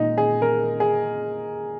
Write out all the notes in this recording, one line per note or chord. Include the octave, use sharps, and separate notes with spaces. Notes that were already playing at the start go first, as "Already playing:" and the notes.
Already playing: A#2 G#3 D#4
G#4
A#4
G#4